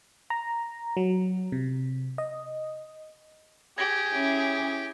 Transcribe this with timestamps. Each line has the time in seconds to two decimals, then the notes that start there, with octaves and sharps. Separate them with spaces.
0.30 A#5
0.97 F#3
1.52 C3
2.18 D#5
3.78 G4 G#4 G#6 A#6
4.13 C#4 E4